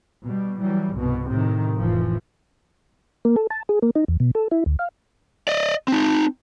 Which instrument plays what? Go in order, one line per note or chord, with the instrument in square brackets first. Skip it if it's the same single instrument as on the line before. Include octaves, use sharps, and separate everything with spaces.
[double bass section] B2 G3
E3 F#3 G3
C2 G2 B2
A2 C3 D#3
F1 A2 E3 F3
[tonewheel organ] A#3
A4
A5
G#4
A#3
D#4
E2
B2
A4
E4
D2
F5
[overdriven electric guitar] D5 D#5
C4 D#4